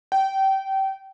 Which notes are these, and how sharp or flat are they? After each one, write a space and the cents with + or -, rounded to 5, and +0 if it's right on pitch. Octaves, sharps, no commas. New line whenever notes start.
G5 -25